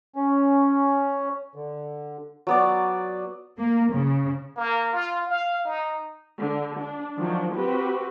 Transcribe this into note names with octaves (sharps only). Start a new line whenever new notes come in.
C#4
D3
F#3 B3 D5
A#3
C#3
A#3
F4
F5
D#4
D3
D4
D#3 F3 F#3 D4
C4 F#4 G4 B4